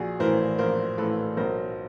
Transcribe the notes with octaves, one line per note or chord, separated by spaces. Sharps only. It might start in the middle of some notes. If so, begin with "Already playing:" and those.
Already playing: A#1 F#4 G#4
A2 E3 A#4 C5
A#1 A#4 C5
A2 E3 A4 B4
B1 A#4 C5